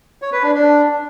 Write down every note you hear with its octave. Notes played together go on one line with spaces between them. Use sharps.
C#5
B4
D4
D4